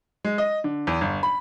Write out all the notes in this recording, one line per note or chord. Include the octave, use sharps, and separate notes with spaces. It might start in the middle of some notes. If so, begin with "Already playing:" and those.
G#3
D#5
D3
E2
G1
B5